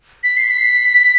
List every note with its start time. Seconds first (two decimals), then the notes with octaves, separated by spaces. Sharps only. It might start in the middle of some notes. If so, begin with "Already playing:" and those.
0.24 B6
0.37 C7
0.50 B6